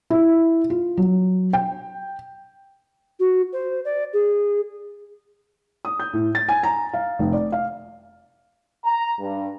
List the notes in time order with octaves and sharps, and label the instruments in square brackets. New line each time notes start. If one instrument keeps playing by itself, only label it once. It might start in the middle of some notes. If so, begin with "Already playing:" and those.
[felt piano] E4
F4
F#3
G5
[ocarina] F#4
C5
D5
G#4
[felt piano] D#6
G6
A2
A6
G#5
A#5
F5
F1
D5
F5
[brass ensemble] A#5
G2